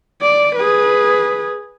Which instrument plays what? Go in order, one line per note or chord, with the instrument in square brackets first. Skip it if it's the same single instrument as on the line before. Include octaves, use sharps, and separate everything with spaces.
[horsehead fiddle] D5
G#4 B4